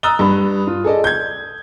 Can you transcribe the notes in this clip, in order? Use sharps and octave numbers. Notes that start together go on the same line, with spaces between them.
A#5 D#6 E6 F#6 A6 G7
G2 B5
F4
G#4 A4 D5 D#5
G6 G#6